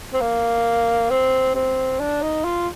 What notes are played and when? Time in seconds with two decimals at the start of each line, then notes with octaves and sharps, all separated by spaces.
0.14 C4
0.21 A#3
1.10 C4
1.55 C4
2.00 D4
2.22 D#4
2.45 F4